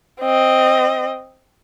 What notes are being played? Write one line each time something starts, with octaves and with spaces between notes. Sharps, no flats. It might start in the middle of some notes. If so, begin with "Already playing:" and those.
C4 D#5